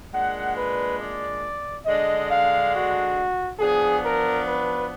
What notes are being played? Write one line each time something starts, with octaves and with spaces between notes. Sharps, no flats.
A#2 G#3 D4 F#5
B4
D5
D3 G#3 D4 D#5
F5
F#4
F3 B3 D4 G#4
A#4
B4